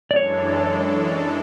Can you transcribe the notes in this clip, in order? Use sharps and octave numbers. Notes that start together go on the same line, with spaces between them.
D5
F#2 E3 G#3 D4 A4 C#5